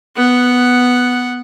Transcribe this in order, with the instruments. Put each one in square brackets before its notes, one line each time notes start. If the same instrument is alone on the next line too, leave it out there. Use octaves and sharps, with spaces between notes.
[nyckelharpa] B3 F#5